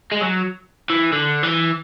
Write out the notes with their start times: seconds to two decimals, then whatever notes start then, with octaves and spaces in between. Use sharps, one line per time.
0.12 G#3
0.21 F#3
0.90 E3
1.13 D3
1.43 E3